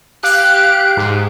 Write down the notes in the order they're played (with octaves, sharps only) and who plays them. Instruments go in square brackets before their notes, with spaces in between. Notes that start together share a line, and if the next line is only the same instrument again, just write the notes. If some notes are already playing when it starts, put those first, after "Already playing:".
[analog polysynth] G4 F5 D7 [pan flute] F#6
[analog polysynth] G#2